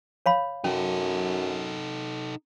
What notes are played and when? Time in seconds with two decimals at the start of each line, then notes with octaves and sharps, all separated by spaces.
0.26 C#5 F5 B5
0.64 F#2 C#4 D#4 A4